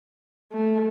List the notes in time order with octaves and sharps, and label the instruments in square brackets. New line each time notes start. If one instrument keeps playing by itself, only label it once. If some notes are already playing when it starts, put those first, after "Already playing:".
[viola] A3